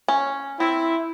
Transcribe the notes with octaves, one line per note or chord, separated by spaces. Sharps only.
C#4
C4 E4